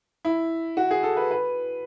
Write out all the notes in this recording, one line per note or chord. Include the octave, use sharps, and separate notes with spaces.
E4
F#4
G#4
A4
B4
B4